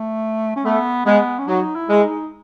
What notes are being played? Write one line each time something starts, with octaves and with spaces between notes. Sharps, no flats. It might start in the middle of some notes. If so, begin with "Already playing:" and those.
Already playing: A3
C#4
A3 B3
G#3 B3
C#4
F#3 D#4
E4
G#3
D#4